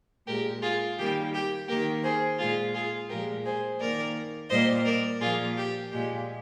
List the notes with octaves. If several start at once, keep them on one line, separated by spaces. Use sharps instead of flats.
A#2 G#3 G4 A#4
F4 G#4
D#3 G3 A#3 G4
G4
D#3 A#3 G4 A#4
G#4 C5
A#2 G#3 F4 G#4
F4 G#4
A#2 F3 G#3 G4 A#4
G#4 C5
D#3 A#3 A#4 D5
A#2 G3 A#3 C5 D#5
A#4 D5
A#2 F3 A#3 F4 G#4
G4
A#2 G#3 G4